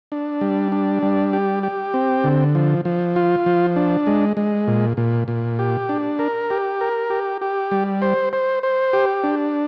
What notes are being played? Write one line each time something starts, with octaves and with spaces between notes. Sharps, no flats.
D4
G3
D4
G3
G4
G4
C4
D3
F3
F3
F4
F3
D4
G#3
G#3
A#2
A#2
A#2
G4
D4
A#4
G4
A#4
G4
G4
G3
C5
C5
C5
G4
D4